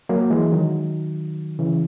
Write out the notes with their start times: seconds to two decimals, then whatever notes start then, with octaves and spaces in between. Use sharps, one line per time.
0.09 F#3 A#3
0.30 E3 G#3
0.52 D#3 F#3
1.59 C#3 E3